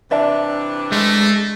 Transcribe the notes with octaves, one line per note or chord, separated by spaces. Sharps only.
C3 E3 D4 D5 E5 A5
G#3 A3